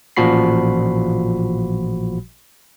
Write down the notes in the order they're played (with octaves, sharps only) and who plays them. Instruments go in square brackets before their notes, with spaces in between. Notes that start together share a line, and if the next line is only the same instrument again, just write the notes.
[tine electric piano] A1 A#2 F3 F#4 B5 C7